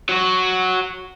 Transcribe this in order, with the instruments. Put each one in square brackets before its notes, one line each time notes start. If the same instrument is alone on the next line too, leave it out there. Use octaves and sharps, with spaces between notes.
[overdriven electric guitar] F#3 F#4